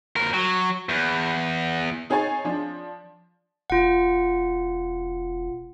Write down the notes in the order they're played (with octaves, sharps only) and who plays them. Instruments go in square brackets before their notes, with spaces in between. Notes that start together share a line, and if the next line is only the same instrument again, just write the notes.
[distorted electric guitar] F2 A#4
F#3
E2
[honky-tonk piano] D#4 G#4 C#5 G#5 A6
F3 D4
[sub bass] E1 [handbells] F4 F#5